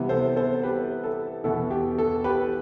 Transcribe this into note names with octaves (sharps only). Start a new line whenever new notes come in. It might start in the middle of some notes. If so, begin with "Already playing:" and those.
Already playing: C3 E3 G3 B3
A4 C5
A4 C5
G4 B4
A4
E2 B2 B3 E4 A4
G4
A4
G4 B4